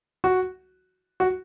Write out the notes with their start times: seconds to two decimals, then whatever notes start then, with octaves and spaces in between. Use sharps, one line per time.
0.24 F#4
1.20 F#4